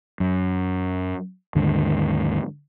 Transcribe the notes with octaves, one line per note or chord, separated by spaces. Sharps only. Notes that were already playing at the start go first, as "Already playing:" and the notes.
F#2
D#2 G#2 D3